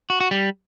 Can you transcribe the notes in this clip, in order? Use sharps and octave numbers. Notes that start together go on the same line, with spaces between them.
F#4
F#4
G3